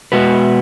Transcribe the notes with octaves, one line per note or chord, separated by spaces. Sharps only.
B2 G#3 B3 F#4 B4